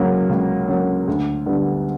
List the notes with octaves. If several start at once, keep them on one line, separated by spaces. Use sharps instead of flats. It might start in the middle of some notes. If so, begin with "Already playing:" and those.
Already playing: C#2 C#3 F#3 A#3
C#2
C#3 F#3 A#3
D2
D3 G3 B3